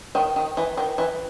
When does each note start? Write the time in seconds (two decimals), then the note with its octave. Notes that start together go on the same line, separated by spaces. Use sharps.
0.15 D#3
0.36 D#3
0.57 E3
0.77 D#3
0.98 E3